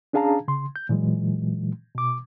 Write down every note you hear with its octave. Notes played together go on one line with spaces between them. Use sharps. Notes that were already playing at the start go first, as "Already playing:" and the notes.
C#4 D4 G#4 F5 A5 A#5
C#3 C6
G6
A#2 E3 F#3 G#3
B2 D6